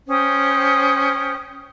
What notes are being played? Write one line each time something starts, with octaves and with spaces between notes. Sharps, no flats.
C#4 C5 G5 D#6